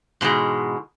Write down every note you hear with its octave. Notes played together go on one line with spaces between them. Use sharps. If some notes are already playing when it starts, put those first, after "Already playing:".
G#2 B2 E3 G#3